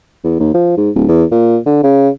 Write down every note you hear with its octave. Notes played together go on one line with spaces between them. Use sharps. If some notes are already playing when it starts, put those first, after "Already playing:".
E2
D#2
F3
G#2
D1
E2
A#2
D3
C#3